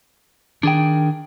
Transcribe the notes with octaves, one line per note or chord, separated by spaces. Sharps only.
D#3 D4 G#4 G5